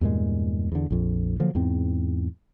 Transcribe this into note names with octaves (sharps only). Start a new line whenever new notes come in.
E2 G2 A#2 G#3
E2 D3
A#1 F2
D3 F3 F#3 A#3
E2 G#2 C4